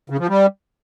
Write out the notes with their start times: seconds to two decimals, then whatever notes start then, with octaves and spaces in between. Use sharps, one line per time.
0.10 C#3
0.19 F3
0.28 G3